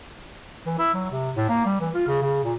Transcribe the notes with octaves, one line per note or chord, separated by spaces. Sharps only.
E3
E4
F#3
C3
A2
A#3
G3
E3
F4
C#3
C#3
A#2